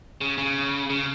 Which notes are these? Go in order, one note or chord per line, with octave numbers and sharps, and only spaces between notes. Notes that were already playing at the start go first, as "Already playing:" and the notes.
C#3
C#3
C#3